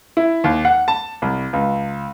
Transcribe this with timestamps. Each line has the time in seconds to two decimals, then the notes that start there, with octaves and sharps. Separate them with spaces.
0.17 E4
0.44 D#2
0.65 F#5
0.88 A5
1.22 C2
1.53 C#2